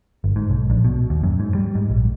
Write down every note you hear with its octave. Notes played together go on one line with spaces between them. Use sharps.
G1
G#2
B1
A#1
B2
D#2
F#2
G#2
G3
G#2
A#1